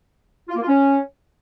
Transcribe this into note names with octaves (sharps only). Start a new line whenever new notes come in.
F4
A#3
F4
C#4